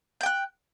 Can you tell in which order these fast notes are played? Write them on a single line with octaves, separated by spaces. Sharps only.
G6 G5 F#6